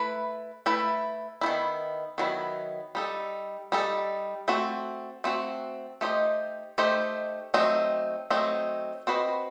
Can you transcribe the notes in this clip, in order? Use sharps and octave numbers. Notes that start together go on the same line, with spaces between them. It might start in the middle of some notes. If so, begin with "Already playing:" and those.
Already playing: A3 E4 B4
A3 E4 B4
D#3 F#3 B3 E4
D#3 F#3 B3 E4
G3 D#4 A4
G3 D#4 A4
A3 C4 F#4
A3 C4 F#4
A3 D#4 G4 C5 D#5
A3 D#4 G4 C5 D#5
F#3 A3 C4 D#4
F#3 A3 C4 D#4
C4 F#4 B4 D#5